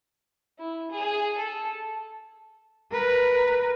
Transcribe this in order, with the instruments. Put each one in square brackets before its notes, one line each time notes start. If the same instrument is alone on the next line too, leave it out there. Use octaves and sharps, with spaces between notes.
[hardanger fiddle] E4
G#4
A4
[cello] A#4 B4